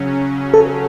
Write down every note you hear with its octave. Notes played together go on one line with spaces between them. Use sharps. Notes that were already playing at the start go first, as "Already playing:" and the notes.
Already playing: C#3 F#3 C#4
A4